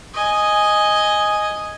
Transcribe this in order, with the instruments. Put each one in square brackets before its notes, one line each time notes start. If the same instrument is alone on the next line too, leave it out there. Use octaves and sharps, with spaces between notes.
[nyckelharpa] D#5 G#5